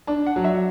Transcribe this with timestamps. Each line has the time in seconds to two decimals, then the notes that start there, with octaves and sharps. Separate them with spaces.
0.07 D4 A5
0.26 F#5
0.36 F#3
0.44 E5